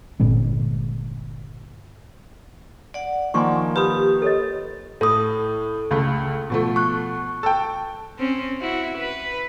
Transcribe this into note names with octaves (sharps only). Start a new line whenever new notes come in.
G1 A#2 G#3 C4
D5 F#5
D#3 F3 A#3 G#5 C6 C#6
G4 B4 B5 D#6
A4 C#5 D#5
A2 A4 D#6
C#2 A3
B2 F3 A3
C#6 F#6
A4 G5
C4 C#4
E4 F#4
B4